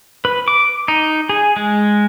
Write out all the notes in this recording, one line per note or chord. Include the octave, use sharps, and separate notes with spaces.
B4
D6
D#4
G#4
G#3